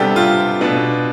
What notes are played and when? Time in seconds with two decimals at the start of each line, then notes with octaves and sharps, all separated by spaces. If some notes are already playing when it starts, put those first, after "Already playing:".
Already playing: C3 G3 B3 D4 G4 A4
0.16 F4
0.61 B2 B3 D4